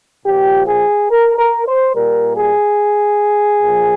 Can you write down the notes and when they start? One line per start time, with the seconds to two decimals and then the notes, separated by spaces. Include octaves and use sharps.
0.24 A#2 F3 G4
0.66 G#4
1.08 A#4
1.36 A#4
1.65 C5
1.93 A#2 G3 A#4
2.35 G#4
3.62 A#2 F3